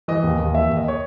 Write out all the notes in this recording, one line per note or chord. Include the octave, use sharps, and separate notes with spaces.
E3 D#5
D#2
D#2
E3 E5
D#2
D#5
C#5